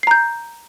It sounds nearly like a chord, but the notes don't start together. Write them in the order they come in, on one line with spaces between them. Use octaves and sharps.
C7 A#5 G6